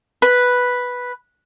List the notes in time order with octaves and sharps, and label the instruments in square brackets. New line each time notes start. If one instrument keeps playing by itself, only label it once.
[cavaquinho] B4